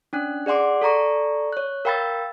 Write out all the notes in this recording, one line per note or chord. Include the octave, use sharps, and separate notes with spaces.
C#4 D4 F#6
G#4 D5 F#5 C6 D6
A4 D5 A#5 C#6
C#5 F#6
A#4 F5 G5 B5 E6 A6